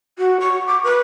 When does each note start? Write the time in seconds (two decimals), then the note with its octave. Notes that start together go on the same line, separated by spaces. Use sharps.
0.18 F#4
0.40 C#6
0.66 D6
0.83 B4